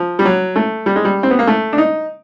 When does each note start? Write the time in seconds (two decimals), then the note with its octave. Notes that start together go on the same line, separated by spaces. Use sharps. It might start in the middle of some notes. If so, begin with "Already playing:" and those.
Already playing: F3
0.19 G3
0.25 F#3
0.56 A3
0.86 G3
0.96 G#3
1.05 G3
1.23 C4
1.31 B3
1.39 A#3
1.47 A3
1.73 D4
1.78 D#4